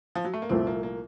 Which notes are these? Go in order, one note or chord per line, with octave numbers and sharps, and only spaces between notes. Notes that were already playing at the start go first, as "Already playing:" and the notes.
F3
F#3
A3
A#3
C2 A#2 F3 A3 C4
A#3
A#3